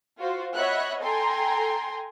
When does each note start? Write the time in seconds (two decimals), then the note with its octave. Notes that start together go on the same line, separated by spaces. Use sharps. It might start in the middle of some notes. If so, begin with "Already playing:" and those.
0.19 F4 F#4 C5
0.55 C#5 D#5 E5 F#5 B5 F#6
1.02 A4 G5 G#5 A#5 C6